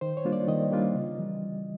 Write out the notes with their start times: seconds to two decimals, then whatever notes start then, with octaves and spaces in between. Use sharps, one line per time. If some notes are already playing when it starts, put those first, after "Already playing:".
0.01 D#3 C5
0.17 C#5
0.25 G3 A#3 D4 F4
0.32 D5
0.48 D#3 D#5
0.71 G3 A#3 D4 F4
0.94 C#3
1.18 E3 G3